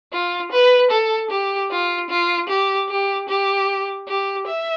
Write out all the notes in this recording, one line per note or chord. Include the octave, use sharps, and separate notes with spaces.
F4
B4
A4
G4
F4
F4
G4
G4
G4
G4
E5